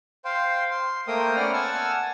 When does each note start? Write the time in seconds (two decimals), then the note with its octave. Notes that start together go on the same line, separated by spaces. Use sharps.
0.25 C5 F5 G5 C6
0.71 C6
1.07 A3 A#3 A#4 C5 G5 D#6
1.36 B3 C#4 D5 F#5 F6
1.53 F#5 G#5 A5 E6 F6